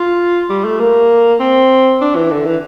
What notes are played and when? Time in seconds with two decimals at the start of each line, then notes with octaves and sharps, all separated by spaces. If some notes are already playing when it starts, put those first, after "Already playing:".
Already playing: F4
0.49 G3
0.65 A3
0.80 A#3
1.40 C4
2.01 D4
2.16 E3
2.31 D3
2.45 E3